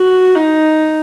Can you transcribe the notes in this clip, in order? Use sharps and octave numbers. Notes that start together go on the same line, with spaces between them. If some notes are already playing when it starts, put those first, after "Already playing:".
Already playing: F#4
D#4